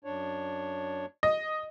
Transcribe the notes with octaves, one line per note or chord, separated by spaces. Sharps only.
F#2 D4 C#5
D#5